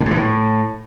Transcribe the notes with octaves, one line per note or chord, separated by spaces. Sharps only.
A2
G#2
E3
A2